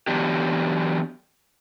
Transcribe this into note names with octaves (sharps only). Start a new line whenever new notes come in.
E3 F#3 B3 D4 G4